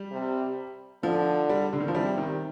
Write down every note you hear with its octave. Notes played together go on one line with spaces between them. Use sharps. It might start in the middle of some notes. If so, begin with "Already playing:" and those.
Already playing: G3
C3
D3 F3
G3
D3
D#3
F3
C3 G3
D#3